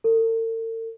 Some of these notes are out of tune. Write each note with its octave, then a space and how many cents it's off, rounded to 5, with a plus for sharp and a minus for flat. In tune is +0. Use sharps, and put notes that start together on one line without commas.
A4 +45